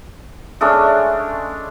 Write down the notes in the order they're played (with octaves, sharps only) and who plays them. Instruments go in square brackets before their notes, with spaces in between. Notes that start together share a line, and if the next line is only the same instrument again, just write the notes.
[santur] G#3 A3 C#4 D4